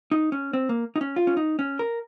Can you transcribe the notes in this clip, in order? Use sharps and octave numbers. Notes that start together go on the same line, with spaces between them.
D#4
C#4
C4
A#3
D#4
C#4
F4
C#4
D#4
C#4
A#4